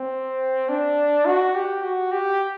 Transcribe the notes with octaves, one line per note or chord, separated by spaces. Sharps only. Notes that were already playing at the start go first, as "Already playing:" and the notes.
Already playing: C4
D4
F#4
G4
F#4
G4